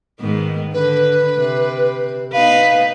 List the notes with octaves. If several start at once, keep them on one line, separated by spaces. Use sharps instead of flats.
G#2 D#3 B3
D3 B4
C3
B3 D#4 B4 F5